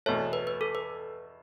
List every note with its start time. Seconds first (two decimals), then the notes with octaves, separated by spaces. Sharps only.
0.06 E2 B2 A3 C#5
0.33 B4
0.47 B4
0.61 A4
0.75 B4